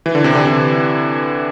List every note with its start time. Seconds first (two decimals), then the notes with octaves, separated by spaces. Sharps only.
0.06 E3
0.15 D3
0.24 C3
0.35 D3
0.47 C3